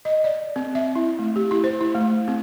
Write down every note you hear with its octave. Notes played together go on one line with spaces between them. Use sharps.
D#5
D5
C4
E5
E4
A3
G4
E4
C5
E4
A3
C4